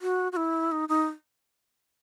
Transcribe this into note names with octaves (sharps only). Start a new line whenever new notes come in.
F#4
F#4
E4
D#4
D#4